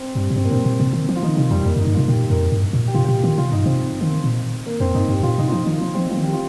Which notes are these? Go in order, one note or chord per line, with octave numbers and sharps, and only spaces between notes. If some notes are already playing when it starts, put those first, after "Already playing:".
Already playing: C4
G2 G3
A#2
G2 C4
A#3
A#2 C4
A#2
C3
D#3
F3
F4
D#3 D#4
C3 D#3
F2 G3
F2 A#3
G2
D#4
G2
C3 F4
A#4
A#2 G4
F2 A#4
G2
A#2
G4
C3 F4
A#2 G4
D#3
C3 F4
G2 D#4
C3 C4
D#3
A#2
A#3
F2 C4
G2 D#4
G2 G4
A#2 F4
C3 D#4
F4
F3 D#4
D#3
F3
F3 C4
F3 F4
D#3
G4
F4